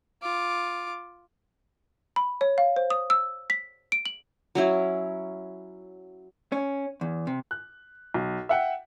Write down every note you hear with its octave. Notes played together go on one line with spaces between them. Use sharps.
F4 D6
B5
C#5
F5
C5
D#6
E6
B6
D7
F#7
F#3 C#4 E4
C#4
E2
C3
F#6
B1
E5 F#5 G5